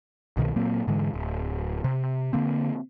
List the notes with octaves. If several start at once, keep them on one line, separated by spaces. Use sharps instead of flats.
C2 B2 D#3
A#2 F#3 A#3 C4
G#2 D3 E3 G#3
D1
C3
D3 A#3 C4